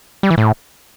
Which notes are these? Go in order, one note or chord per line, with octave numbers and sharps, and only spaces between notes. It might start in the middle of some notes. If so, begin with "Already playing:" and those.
G3
E3
A2